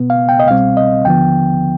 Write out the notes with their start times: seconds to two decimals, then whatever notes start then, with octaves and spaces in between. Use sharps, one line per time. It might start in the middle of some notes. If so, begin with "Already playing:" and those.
Already playing: B2 B3
0.10 F5
0.29 G5
0.40 D#5
0.48 C2 B2 G3 C4 F5
0.77 D#5
1.05 D#2 D3 F3 B3 G5